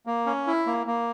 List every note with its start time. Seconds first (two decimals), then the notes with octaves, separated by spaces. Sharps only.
0.06 A#3
0.26 C#4
0.47 E4
0.67 A#3
0.87 A#3